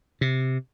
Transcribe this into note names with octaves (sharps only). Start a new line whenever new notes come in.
C3